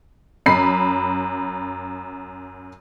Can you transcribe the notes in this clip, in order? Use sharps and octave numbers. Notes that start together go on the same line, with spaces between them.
F#2 B5 C7